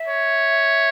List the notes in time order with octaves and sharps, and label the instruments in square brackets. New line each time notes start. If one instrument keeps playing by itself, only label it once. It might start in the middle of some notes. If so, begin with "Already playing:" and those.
Already playing: [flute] E5
[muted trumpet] C#5